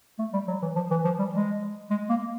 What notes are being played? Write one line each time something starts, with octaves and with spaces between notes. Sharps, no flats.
A3
G3
F#3
E3
F3
E3
F3
G3
G#3
G#3
A#3